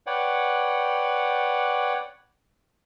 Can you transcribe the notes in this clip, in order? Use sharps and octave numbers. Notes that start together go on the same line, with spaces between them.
B4 C#5 D5 F#5 G5